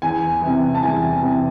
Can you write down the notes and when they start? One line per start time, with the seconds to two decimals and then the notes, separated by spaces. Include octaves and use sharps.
0.02 E2 G#5
0.42 C3 E3
0.75 A5
0.83 E2 G#5
1.22 C3 E3